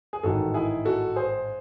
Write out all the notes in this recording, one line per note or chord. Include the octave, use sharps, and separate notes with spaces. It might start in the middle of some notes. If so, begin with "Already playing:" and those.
G#4
A1 G#2 D#3 F#4 A4
E4 G#4
F#4 A4
G#4 C5